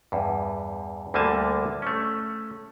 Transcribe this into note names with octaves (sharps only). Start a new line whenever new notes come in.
E2 G2
D2 D3 G3 A#3 G#5 A5
A3 C#4